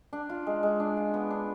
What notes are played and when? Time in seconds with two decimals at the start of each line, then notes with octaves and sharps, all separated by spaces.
0.13 D4
0.29 F4
0.47 G#3
0.63 G#3
0.80 D4
0.97 F4
1.14 B3
1.30 D4